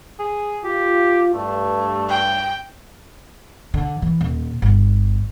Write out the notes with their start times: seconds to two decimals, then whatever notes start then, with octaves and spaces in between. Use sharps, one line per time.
0.20 G#4
0.64 F4 G4
1.34 G2 A3
2.09 G5
3.74 D3
4.02 E3
4.21 D#1
4.62 G1